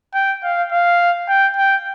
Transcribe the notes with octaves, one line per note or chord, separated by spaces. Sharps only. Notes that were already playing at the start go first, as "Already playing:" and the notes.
G5
F5
F5
G5
G5